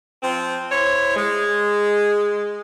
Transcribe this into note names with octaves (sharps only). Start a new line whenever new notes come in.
F3 C4
E4 C5 C#5
G#3